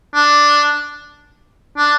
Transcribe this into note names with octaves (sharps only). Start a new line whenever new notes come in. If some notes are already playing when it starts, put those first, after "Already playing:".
D4
D4